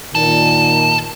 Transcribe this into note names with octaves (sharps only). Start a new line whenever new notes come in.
A#2 D#3 A4